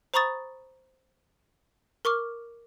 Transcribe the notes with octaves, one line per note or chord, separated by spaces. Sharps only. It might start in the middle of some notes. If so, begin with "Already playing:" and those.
C5 A#5 B5 C#6 D#6 A6
A#4 C#6 D6 F6